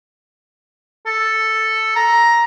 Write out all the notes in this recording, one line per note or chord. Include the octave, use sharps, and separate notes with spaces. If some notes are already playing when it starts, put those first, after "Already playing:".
A4
A#5